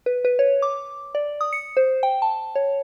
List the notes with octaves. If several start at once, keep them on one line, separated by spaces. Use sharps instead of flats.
B4
B4
C#5
D6
D5
D#6
C#7
C5
G5
A5
C#5